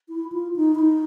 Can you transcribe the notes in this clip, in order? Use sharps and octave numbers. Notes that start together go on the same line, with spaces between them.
E4
F4
D#4
E4
D#4